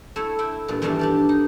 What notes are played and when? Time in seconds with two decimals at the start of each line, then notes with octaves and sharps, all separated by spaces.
0.16 A3 E4 C#5
0.39 E4 G5
0.68 G2 A#2
0.82 E2 G2 D#3 G3 A3 D4
0.99 D4 G4 D5
1.29 D#4